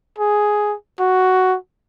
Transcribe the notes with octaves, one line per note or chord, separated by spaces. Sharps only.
G#4
F#4